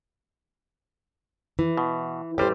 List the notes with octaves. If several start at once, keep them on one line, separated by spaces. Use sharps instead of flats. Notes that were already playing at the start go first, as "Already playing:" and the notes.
E3
B2
A1 G3 G4 C5